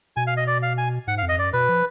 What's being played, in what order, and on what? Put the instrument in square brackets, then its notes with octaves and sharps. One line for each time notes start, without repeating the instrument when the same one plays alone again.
[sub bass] B2 [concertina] G#5
[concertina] F5
D#5
D5
F5
G#5
[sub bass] G#2 [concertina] F#5
[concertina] F5
[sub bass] F2
[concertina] D#5
[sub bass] F#2 [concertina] D5
[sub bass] B2 [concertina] B4
[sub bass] F3